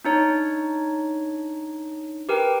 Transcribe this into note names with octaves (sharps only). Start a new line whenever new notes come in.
D4 D#4 C#5
G4 A#4 B4 G5